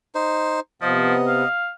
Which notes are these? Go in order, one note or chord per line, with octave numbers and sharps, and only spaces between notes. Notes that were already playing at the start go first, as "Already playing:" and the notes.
D#4 C5
C3 F3 B3 D#5
F5